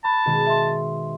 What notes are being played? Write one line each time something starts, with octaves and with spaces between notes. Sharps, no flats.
A5 B5 C#6 F#6 A#6
B2 D#3 G#3
E5 C6